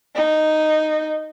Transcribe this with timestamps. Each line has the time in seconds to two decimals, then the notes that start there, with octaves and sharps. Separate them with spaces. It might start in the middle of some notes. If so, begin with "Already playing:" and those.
0.16 D#4